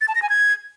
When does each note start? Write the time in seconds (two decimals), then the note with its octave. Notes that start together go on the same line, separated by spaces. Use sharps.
0.01 A6
0.08 A5
0.15 A#6
0.22 G#5
0.29 G#6